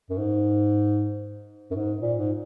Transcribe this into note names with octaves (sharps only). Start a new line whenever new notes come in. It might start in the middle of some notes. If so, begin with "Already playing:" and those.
F#2
G#2
F#2
G#2
A#2
G#2